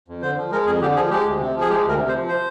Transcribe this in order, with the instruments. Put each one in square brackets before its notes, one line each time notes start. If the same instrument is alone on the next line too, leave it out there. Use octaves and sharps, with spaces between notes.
[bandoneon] F2
D3 C5
F3
G#3 A#4
F2 G#4
D3 G4
F3 G#4
G#3 G4
D2
C3
F3
G#4
G#3 G4
D2 A#4
C3
C5
F3
C5